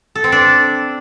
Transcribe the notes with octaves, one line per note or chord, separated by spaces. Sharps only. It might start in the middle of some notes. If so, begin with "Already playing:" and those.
A4
C4
D4